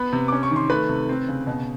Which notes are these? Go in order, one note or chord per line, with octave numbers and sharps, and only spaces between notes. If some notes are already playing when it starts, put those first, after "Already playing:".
Already playing: B3 B4 B5
C3
C#4 D6
C#6
D#3
C6
A3 B4 B5
C3
C4
C#3
B2